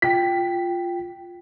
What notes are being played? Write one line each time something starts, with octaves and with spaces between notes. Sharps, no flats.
F4 G5 B6